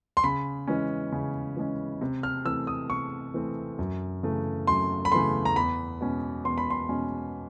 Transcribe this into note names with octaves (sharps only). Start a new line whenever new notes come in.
C6
C#3 B5
E3 G#3 C#4
C#3
E3 G#3 C#4
C3
F6
E3 A3 C4 E6
D#6
C3 C#6
E3 A3 C4
F#2
C#3 E3 A3
F#2 C6
B5
C#3 E3 A3 C6
A#5
E2 B5
B2 G#3 C#4
E2 C6
B5
C6
B2 G#3 C#4